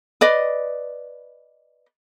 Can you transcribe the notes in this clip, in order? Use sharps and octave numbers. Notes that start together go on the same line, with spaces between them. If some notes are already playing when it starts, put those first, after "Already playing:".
B4 D5 D#5